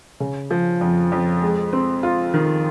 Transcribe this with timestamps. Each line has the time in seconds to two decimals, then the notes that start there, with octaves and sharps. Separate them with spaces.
0.20 C#3
0.51 F3
0.81 F2
1.12 F2
1.42 G#3
1.73 C4
2.03 F4
2.34 D#3